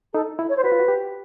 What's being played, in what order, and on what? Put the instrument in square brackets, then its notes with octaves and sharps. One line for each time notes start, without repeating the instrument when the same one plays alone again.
[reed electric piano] D#4 [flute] A4
[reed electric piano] E4
[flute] C#5
C5
[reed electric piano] F#4 [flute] B4
[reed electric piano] F4
F#4
G4